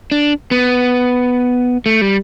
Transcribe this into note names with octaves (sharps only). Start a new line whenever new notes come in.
D4
B3
A3
G3